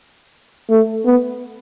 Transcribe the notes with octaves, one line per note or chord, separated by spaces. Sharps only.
A3
B3